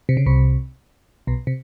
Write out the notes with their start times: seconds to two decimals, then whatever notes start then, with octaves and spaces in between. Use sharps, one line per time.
0.09 C3
0.17 C#3
0.26 C2 C3
1.27 B1 B2
1.47 C3